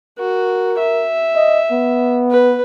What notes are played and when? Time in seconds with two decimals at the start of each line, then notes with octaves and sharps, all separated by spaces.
0.19 F#4 A#4
0.79 E5
1.36 D#5
1.72 B3
2.30 B4